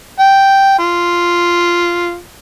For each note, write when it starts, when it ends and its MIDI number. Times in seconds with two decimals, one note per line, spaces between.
0.19 0.76 79
0.79 2.17 65